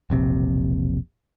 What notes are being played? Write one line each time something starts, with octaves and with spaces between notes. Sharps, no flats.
E1 A#1 C3